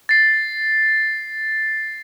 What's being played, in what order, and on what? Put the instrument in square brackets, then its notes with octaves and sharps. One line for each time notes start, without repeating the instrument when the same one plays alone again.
[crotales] A6 C7